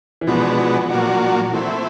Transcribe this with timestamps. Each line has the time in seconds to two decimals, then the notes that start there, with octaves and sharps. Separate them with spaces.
0.21 E3
0.27 B2 F3 G#3 B3 D4 F#4
0.90 A#2 F#3 A#3 D4 F#4
1.53 F3 A3 C4 E4